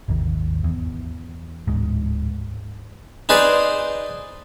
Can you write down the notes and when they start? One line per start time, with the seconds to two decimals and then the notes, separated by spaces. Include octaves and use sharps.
0.08 G#1 D#2
0.64 E2
1.67 D1 G#2
3.29 D#4 G#4 B4 C5 D5